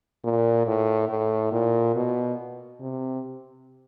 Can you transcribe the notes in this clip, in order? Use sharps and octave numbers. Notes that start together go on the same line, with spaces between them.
A#2
A2
A2
A#2
B2
C3